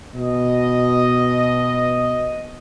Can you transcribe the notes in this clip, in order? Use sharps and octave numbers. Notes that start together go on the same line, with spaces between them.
B2 D#5